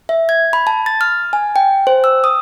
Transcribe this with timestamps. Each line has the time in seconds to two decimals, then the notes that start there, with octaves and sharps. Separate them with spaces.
0.09 E5
0.29 G#6
0.53 B5
0.67 A5
0.86 A6
1.01 F6
1.33 G#5
1.56 G5
1.87 C5
2.04 E6
2.24 D#6